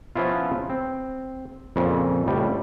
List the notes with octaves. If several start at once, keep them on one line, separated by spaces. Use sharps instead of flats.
F3 B3 C#4 E4 F4
C4
F2 A#2 C#3
C#2 A2 G3